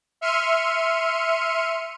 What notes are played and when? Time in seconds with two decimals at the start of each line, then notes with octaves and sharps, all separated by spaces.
0.21 E5 C6 F6 C#7 D#7